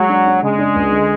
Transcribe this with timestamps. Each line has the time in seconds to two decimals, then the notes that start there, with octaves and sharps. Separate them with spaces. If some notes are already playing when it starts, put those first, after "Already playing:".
Already playing: F#3 G#3
0.09 D4
0.27 D4
0.42 C#3 G#3
0.58 D4
0.75 C#2
0.92 D3